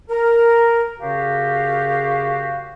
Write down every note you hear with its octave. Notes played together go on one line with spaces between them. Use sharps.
A#4
F#2 C#3 F#4 G4 F5